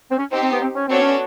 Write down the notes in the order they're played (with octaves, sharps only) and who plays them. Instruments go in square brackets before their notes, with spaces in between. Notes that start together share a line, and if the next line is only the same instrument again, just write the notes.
[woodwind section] C4
C#4
[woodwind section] C4 [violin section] D#4 G4 C5
[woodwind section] C4
B3
C4
C#4
[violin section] B3 D4 F#4 A4 C#5 [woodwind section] C4
[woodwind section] C#4